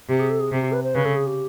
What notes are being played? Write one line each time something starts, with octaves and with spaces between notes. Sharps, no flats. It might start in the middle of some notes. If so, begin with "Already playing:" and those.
C3 G4
G#4
A4
G#4
C3
G4
B4
C5
C#3 B4
A4
G#4
G4